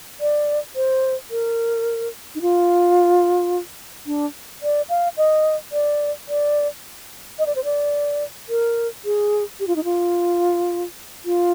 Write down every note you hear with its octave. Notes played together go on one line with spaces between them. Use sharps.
D5
C5
A#4
D#4
F4
D4
D5
F5
D#5
D5
D5
D#5
D5
C5
D5
A#4
G#4
G4
F4
D#4
F4
F4